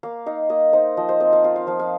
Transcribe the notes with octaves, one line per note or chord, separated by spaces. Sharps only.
A#3 F5
D#4 F5
A#3 D#5
D#4 C5
F3 D#5
C5
C4 D#5
F5
F4 F5
F5
F3 F5
F5